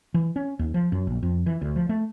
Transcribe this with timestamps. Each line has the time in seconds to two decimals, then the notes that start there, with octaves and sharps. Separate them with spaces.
0.14 E3
0.36 C#4
0.59 D#2
0.74 F3
0.92 F#2
1.07 A#1
1.23 F2
1.46 E3
1.62 D2
1.76 F3
1.89 A3